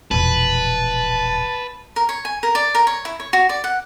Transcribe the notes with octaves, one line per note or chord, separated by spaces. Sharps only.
E1 A#1 B4 A5
A#4
C#5
G#5
A#4
D5
A#4
C#5
E4
C#5
F#4
D5
F#5